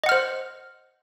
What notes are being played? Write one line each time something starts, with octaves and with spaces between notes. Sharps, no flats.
C5 D#5 F#5 F6